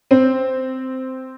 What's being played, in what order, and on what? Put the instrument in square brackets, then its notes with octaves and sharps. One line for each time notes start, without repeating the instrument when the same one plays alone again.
[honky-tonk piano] C4